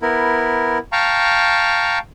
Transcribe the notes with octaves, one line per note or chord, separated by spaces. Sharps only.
B3 E4 A#4
F5 G5 A5 A#5 C#6